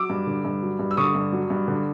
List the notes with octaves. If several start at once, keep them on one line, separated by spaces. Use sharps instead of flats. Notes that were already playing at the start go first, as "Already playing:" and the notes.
Already playing: F#3 D6 E6
G2
D3
G2
F#3
G2
E6
D3 C#6 D#6
G2
F#3
G2
D3